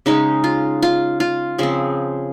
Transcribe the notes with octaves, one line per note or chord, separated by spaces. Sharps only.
C#3 G#3 C#4 D#4
F4
F4
F4
C#3 F3 C4 G#4